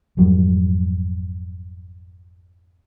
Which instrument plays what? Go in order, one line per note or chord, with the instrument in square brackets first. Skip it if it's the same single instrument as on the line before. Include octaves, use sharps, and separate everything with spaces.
[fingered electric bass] G#1 F2 F#3 G3